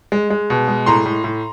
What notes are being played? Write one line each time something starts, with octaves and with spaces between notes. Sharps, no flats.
G#3
G#3
B2
G#3
A2 A#5 C6
A2
A2